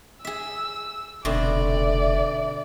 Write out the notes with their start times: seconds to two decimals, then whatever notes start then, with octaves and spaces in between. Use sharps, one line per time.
0.25 G#4 E5 E6
1.25 F1 B2 D3 C4 D5 E5